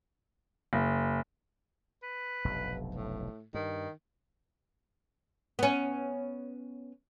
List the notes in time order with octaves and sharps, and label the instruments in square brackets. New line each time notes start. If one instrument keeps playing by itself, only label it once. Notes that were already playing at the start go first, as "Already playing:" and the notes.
[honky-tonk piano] F#1
[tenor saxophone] B4
[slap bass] F1 B1 G2
[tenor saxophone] A2
[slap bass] G2 [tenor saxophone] D#3
[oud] B3 C#4